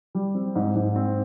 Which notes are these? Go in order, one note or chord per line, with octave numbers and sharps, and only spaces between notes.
G3
C4
G#2
G#2
C4